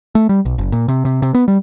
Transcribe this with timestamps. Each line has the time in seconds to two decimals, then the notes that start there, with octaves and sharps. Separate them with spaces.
0.15 A3
0.29 G3
0.45 B1
0.58 F#1
0.72 A#2
0.88 C3
1.05 C3
1.22 C3
1.34 B3
1.48 G3